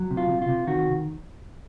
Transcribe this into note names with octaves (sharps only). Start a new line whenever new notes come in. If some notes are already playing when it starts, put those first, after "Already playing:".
Already playing: F#3
C3
F4
C3
F4
C3
D#3 F#4